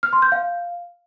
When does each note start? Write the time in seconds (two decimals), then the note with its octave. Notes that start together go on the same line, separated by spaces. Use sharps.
0.03 F6
0.13 C6
0.22 G6
0.32 F5